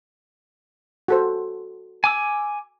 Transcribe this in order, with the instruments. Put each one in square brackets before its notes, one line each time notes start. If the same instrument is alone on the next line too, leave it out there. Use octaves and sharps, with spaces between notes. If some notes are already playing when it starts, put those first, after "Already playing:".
[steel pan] F#4 A4 C5
[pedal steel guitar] G#5 D6 E6